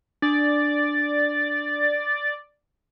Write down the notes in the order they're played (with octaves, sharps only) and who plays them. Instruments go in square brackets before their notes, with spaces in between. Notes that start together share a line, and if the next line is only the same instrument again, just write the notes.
[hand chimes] D4 [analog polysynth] D5 [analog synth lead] A6